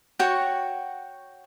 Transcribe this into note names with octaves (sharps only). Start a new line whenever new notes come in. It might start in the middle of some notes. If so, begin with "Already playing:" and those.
F#4 C#5 F#5 G5